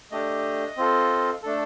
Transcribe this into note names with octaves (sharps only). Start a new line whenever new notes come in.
A3 D4 G4 D#5
C4 F4 A4
A3 D4 A4